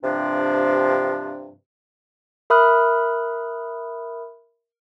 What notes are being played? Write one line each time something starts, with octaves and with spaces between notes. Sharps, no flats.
G2 C3 F3 D4
A#4 E5 B5 D#6 F6 F#6